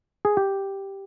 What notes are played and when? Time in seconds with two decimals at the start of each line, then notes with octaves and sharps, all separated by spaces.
0.25 G#4
0.37 G4